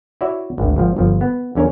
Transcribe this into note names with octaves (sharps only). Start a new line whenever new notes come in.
E4 F#4 C#5 D5 E5
G#1 D2
G#1 F3
G1 F3
B3
E2 D3 C#4 A#4 C#5